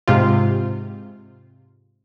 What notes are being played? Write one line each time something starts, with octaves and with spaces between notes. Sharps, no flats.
G#2 C3 F4